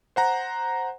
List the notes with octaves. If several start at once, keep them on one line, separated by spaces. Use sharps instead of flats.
C5 F#5 A#5